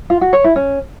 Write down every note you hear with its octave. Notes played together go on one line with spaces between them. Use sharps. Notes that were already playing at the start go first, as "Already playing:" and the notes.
F4
F#4
C#5
E4
C#4